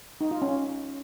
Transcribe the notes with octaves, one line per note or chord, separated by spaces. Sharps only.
D#4
F4
C#4